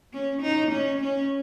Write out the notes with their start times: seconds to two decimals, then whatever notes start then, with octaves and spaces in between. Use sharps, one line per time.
0.13 C#4
0.42 D#4
0.72 C#4
1.01 C#4